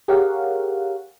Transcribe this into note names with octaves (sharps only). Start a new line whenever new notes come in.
G4 G#4 A#4 C#5 F5 F#5